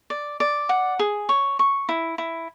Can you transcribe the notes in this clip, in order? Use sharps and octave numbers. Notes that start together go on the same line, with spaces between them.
D5
D5
F#5
G#4
C#5
C#6
E4
E4